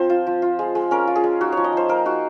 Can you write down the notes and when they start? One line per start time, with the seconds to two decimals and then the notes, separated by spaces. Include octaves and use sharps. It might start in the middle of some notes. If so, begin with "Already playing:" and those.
Already playing: F3 C4 C5
0.10 F4
0.27 F3
0.42 F4
0.59 G#3
0.75 G#3
0.91 C#4 A#4
1.07 F4
1.16 G#4
1.24 G#3
1.41 D#4 F#4
1.52 F3 C#5
1.64 D#5
1.72 F3 C5
1.89 A#3 A#4
2.05 D#4 F#4